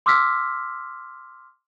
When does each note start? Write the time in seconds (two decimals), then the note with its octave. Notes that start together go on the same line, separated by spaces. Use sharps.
0.06 C6 D6 E6 F6 B6